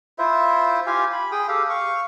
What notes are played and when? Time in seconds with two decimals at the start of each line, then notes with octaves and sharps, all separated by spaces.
0.19 E4 F4 C5 E5
0.87 F4 G4 F5 G#5
1.13 B5
1.32 G#4 G5 D#6
1.48 G4 A4 F5
1.70 F5 C#6